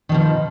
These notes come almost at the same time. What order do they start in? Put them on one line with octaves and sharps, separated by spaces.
D#3 F3 B2